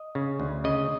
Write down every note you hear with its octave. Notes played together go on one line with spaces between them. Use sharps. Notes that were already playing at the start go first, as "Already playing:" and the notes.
Already playing: D#5
C#3
D2
C#3 D#5